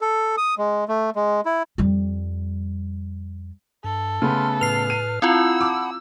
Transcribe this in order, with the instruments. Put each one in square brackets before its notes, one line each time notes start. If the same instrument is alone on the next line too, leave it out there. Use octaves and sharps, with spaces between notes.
[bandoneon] A4
D#6
G#3
A3
G#3
E4
[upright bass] F2 G3
[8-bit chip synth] G2 [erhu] A4
[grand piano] C#3 A3 B3 [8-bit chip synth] C6 F6
[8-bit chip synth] A2 B4 F6 [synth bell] C7 F7
[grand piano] D#7
[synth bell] C4 E4 F4 [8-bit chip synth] F#5 A5 B5 [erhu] E6
[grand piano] D6